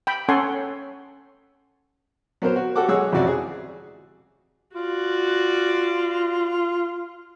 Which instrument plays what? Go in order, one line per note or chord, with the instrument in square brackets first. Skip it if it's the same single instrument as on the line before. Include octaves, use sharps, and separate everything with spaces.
[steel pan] G5 B5
C#4 A4 C#5 F#5 G#5 C6
[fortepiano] F#3 B3 A#4 C5
F#4
F#4 G4 A4 F#5 D6
F#3 G#3 G#4 C#5 F#5 E6
A1 F2 C3 F3 F#4 D5
G#4
[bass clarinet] F4 [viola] F#4 D5